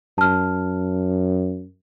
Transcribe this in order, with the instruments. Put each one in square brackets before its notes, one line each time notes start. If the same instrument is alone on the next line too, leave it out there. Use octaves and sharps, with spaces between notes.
[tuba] F#2 [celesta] A5 F6